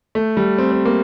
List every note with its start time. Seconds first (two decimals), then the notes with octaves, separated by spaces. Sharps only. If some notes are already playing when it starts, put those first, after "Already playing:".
0.15 A3
0.37 G3
0.58 C4
0.72 C4
0.85 A#3